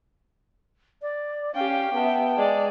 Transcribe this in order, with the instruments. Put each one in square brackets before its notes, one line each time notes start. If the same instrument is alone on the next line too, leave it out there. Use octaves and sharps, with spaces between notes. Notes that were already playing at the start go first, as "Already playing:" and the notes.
[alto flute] D5
[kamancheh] C#4 G4 [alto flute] F5 [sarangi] G5
[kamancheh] B3 E5 [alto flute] A5
[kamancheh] G#3 D5